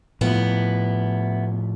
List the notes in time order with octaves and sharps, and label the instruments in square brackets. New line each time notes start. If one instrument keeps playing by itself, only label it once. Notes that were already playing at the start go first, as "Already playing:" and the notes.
[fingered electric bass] A2 F3 [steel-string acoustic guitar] B3 E4